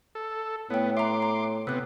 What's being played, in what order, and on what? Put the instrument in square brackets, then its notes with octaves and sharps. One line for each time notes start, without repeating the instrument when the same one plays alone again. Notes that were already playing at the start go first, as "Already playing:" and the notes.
[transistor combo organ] A4
[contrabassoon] A2 [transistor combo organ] B3 [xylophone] C#5 G5
[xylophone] E5 A#5 [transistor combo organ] C6 D6
[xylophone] A#5
[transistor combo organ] C3 B3 [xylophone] E6 F#6